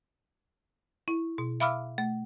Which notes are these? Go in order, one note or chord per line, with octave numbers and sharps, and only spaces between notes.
E4
B2
E5 F5 B5 D6 E6 F6
A3